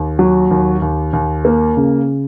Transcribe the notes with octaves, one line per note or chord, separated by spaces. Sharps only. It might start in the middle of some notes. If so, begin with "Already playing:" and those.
Already playing: D#2
F#3
D#2
D#2
D#2
A#3
C#3